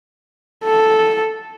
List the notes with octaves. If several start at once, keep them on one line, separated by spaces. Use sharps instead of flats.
A4